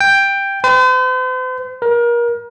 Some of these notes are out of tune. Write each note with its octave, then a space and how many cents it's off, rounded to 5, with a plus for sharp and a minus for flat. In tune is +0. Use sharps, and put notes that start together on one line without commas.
G5 +10
C5 -45
A#4 +30